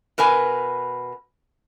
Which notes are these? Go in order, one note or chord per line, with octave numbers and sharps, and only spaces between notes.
B2 A#4 B4 G#5